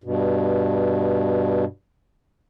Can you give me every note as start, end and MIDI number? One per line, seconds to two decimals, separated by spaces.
0.04 1.65 43
0.04 1.65 47